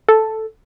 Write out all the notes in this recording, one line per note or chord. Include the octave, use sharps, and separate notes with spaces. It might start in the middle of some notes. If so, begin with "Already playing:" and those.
A4